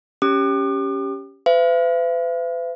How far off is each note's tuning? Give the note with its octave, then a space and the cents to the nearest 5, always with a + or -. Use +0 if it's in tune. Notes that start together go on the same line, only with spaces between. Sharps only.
C#4 +0 G4 +0 D6 +40
B4 +45 E5 +45